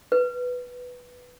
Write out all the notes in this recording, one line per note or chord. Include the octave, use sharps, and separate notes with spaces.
B4